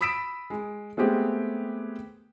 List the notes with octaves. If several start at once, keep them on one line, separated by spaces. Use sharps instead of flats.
B5 D#6 E6 B6 D7 E7
G#3
G#3 A3 B3 C4 G4 G#4